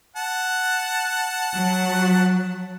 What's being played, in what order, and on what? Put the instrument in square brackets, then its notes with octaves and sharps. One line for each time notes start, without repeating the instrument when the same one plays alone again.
[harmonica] F#5 A5
[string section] F#3